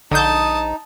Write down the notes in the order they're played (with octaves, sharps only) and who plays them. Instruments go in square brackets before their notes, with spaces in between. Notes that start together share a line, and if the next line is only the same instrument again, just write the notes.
[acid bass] A#1 [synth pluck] D3 G6 [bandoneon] D#4 [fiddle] A5 D#6